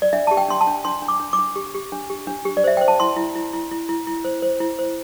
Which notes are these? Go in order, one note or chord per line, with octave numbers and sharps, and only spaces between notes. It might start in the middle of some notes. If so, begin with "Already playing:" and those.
D5
D4 E5
G4 A5
G5
D4 C6
A5
D4
D4 C6
D4
D6
D4
D6
D4
G4
G4
D4
G4
D4
G4
D5
C5 E5
C5 G5
A5
E4 C6
E4
E4
E4
E4
E4
E4
C5
C5
E4
C5